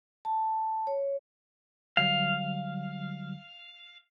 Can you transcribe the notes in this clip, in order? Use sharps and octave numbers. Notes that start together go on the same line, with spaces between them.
A5
C#5
D3 F#3 G3 F5